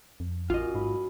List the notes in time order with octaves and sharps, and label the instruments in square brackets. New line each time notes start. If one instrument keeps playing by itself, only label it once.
[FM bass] F2
[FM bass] A1 [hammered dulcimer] F#2 [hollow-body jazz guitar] F4 D#5
[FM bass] G#2 [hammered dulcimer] B5